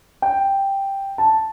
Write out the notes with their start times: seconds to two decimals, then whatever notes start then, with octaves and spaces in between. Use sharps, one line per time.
0.22 G5
1.18 A5